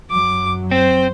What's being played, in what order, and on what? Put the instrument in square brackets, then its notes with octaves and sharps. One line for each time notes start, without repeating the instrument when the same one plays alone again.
[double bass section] F#2 F#3 [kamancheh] D6
[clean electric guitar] C4 [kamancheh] C5